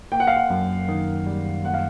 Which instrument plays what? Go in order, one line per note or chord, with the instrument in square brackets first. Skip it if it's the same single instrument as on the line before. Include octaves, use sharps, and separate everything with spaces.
[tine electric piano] A#3 [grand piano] G5
[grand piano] F#5
F5
F#5
[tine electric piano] F#2
D#3
G3
[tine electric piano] A#3 [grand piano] F#5
[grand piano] F5